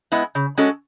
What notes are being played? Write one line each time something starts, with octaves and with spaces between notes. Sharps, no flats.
G#3 B3 E4
C#3
G#3 C#4 F#4 A4